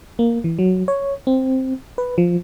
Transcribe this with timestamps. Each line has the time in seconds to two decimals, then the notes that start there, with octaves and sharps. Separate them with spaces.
0.19 A#3
0.44 E3
0.59 F#3
0.88 C#5
1.27 C4
1.98 B4
2.18 F3